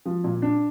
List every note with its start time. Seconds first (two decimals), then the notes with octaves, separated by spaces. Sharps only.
0.06 F3
0.24 A#2
0.42 D4